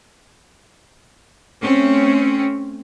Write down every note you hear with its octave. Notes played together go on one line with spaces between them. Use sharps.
A3 C4 C#4